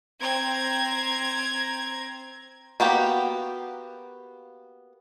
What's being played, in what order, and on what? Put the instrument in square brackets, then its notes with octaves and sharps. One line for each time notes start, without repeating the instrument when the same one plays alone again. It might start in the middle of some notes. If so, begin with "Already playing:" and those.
[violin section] C4 A#5 G#6
[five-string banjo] A#3 B3 F#4 G4